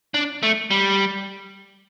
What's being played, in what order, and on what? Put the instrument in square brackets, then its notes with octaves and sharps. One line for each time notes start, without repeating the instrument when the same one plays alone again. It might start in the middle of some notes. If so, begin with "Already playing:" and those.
[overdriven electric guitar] D4
A3
G3